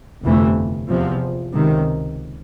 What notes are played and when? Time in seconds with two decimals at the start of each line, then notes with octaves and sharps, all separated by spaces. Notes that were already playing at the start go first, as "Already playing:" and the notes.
0.22 G1 F2 C3 E3 A3
0.88 E2 C3 F3
1.54 C#2 C3 D#3